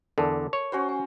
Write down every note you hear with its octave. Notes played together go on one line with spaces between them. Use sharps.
E2 D3 A4 A#4 A5
C#5
C#4 F#4 C5
G#5